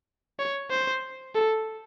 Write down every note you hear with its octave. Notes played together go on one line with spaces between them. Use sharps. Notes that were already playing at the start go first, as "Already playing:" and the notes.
C#5
C5
A4